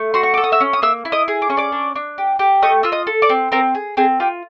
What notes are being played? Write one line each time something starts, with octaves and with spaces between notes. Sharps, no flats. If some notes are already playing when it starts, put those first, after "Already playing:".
Already playing: A3
F#4 C6
C#6
A4 D6
D#6
E5 E6
C#4
D#6
A#3 E5 E6
E4
D#5 D#6
G#4
D6
C#4 C#6
D5 D6
D4
D4
G4
G4
A3 D#5 D#6
F4 E6
D#5 D#6
A4
D5 D6
C4
C4 A#4 A#5
G#4
C4 G#4 G#5
F4 G4 G5